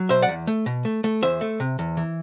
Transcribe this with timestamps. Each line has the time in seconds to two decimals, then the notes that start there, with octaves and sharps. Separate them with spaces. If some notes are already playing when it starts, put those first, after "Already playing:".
Already playing: F#3
0.09 B2 C5 E5
0.22 D5 F#5
0.28 E2
0.47 A3
0.66 B2
0.85 A3
1.04 A3
1.22 E2 C5 E5
1.41 A3
1.60 C3
1.79 E2
1.97 E3